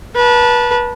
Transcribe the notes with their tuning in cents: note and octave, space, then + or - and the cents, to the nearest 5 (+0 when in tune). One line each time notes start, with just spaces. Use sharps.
B4 -30 A5 +0